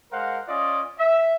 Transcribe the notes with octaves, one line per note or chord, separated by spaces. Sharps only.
G#3 A#4 C5 F5 F#5
C#4 F4 D5 D#5
E5